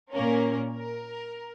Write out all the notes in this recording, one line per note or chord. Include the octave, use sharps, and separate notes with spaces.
A#2 A#3 C#4 A#4
A#4